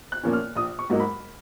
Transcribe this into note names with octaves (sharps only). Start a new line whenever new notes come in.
F#6
A#2 F3 A#3 C#4
F6
A#1 D#6
C#6
G#2 F#3 A#3 D#4
B5